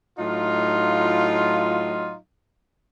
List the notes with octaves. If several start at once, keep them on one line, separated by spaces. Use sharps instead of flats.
A2 F#3 D#4 F4